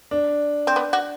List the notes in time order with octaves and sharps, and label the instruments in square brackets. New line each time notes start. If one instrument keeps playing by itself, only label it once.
[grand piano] D4
[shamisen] C4
B3
F#4